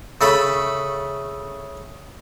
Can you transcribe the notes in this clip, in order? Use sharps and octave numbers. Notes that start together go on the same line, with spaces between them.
C#3 A3 A4 E5 B5